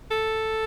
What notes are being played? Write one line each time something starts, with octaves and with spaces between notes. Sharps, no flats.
A4